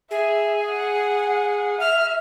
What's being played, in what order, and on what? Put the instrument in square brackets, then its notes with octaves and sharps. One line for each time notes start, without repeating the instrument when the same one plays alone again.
[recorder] G#4 [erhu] E5
[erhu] F#5
[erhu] E5 [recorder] F6